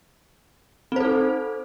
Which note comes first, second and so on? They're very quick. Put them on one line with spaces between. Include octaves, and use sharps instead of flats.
C4 C5 A4 D#4